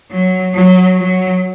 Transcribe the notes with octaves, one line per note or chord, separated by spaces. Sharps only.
F#3
F#3
F#3